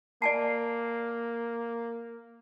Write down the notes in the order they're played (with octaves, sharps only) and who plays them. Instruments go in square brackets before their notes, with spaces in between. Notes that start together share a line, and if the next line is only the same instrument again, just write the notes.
[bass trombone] A#3 [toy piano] D5 G#5 A5 [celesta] C7